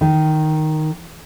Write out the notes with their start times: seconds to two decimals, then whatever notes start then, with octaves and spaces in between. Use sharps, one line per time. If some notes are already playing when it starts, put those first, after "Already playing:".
0.01 D#3